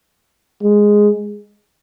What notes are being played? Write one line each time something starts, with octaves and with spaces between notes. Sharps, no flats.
G#3